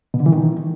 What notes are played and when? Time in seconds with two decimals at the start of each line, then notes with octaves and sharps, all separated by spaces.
0.14 B2
0.20 D3
0.26 E3
0.32 D#3